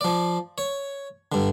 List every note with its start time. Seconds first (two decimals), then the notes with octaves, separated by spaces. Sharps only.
0.01 F3 D5
0.58 C#5
1.32 G2 D3